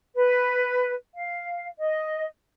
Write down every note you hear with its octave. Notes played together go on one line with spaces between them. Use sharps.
B4
F5
D#5